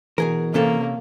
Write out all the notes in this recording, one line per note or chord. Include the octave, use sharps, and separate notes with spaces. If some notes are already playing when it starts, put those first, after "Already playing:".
B2 E3 G#4 A#4
C3 A#3 C#4 A4